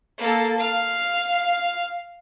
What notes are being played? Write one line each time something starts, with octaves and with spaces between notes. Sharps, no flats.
A#3 A4
F5 F6